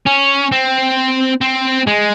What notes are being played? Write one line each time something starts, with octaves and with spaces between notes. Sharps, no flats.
C#4
C4
C4
G#3